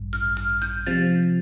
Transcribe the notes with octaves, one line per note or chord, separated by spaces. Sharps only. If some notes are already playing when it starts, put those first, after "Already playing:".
Already playing: A1 G2
F6
F6
G6
C3 F3 A6